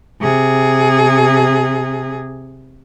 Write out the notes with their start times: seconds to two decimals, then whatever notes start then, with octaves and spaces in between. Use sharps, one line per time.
0.21 C3 G#4